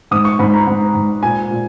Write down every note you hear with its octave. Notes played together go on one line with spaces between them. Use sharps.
G#2 D#6
C#6
G#2 B5
A#5
G#2
G#2
A#2 G#5
A#2